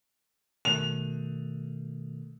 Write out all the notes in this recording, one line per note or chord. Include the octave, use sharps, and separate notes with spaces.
B2 D#3 A3 F7